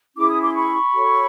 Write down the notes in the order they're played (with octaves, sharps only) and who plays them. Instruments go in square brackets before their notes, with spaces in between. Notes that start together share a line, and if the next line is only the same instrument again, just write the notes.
[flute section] C#4 E4 G#4 D6
D#6
C6 D6
B5 C#6
F#4 A4 C#5